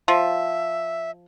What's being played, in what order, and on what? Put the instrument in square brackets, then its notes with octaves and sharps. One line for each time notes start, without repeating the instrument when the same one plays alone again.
[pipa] F3 [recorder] E5